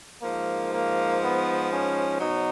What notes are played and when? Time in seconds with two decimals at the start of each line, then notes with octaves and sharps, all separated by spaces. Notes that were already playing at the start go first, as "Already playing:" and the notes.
0.21 G#2 F3 A#3
0.71 A#3
1.21 B3
1.70 C#4
2.19 B2 F#3 D#4